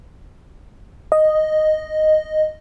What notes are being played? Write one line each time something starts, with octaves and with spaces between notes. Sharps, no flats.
D#5